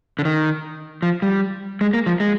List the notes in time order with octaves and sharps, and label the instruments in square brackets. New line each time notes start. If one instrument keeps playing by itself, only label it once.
[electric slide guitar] D3
D#3
F3
G3
G#3
A#3
F3
G#3